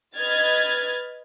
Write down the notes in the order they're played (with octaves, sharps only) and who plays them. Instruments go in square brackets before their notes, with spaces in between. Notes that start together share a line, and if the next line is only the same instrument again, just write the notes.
[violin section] B4 D#5 F6 G#6 A6